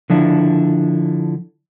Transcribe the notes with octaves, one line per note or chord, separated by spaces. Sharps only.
D3 F3 D4 E4